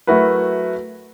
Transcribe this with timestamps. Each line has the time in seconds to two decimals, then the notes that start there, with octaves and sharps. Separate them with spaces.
0.07 F#3 A3 E4 F#4 A#4 B4